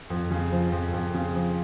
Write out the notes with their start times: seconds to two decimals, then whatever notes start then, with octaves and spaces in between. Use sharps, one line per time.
0.10 F2
0.31 C#3
0.52 F3
0.72 F2
0.93 F2
1.14 C#3
1.35 F3